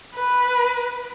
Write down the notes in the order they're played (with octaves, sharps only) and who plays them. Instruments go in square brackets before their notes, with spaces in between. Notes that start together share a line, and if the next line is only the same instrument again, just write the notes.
[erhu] B4